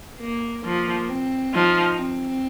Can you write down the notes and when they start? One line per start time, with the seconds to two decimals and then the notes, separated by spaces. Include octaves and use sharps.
0.20 A#3
0.64 F3 A#3
1.09 C4
1.53 F3 D#4
1.98 C4